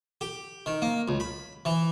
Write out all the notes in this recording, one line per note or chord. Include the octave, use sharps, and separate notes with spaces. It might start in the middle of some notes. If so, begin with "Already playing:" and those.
G4
D#3
A#3
C#2
B5
E3